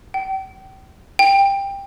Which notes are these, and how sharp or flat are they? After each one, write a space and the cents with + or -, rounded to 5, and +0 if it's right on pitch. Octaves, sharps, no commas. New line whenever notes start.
G5 -35
G5 +15